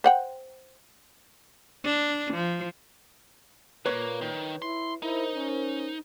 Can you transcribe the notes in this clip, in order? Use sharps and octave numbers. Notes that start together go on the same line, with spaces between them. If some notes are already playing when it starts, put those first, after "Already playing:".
C5 F#5 G5
D4
F3
A#2 A#3 B4 C#5
D#3
E4 C6
D#4 E4 A#4 C5
C#4